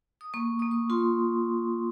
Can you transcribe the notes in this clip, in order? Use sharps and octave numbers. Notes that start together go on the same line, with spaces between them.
D#6
A#3 C#6
A#3 D#6
C#6
F4 C6